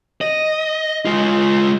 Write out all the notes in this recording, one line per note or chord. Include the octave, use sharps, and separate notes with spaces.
D#5
G#3 F4